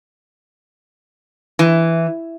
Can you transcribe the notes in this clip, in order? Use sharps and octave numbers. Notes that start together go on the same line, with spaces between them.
E3